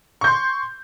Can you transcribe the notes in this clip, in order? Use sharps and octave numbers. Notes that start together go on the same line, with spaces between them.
C6 C#6 G6